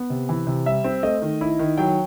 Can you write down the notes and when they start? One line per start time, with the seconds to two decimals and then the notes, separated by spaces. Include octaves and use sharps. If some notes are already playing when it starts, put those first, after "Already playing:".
Already playing: B3
0.10 C3
0.29 E3
0.47 C3
0.66 G3 E5
0.84 C4
1.03 A3 D#5
1.22 D#3
1.41 E4
1.59 D#3
1.78 F#3 G5